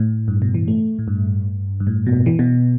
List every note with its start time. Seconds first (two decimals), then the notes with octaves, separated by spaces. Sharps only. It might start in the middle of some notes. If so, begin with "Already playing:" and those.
Already playing: A2
0.28 G2
0.42 B2
0.54 E3
0.68 A3
0.99 A2
1.08 G2
1.80 G2
1.87 A2
2.07 B2
2.26 E3
2.39 B2